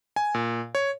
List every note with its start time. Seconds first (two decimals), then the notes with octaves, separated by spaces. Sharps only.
0.16 G#5
0.34 A#2
0.75 C#5